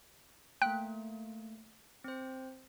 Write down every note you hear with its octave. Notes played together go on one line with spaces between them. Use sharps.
A3 A#3 G5 F#6
C4 C5